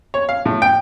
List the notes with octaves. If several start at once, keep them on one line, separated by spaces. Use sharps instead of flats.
C#5
F5
A2
G5